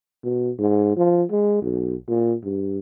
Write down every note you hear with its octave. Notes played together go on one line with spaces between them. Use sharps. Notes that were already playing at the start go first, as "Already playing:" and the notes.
B2
G#2
F3
G#3
B1
A#2
G2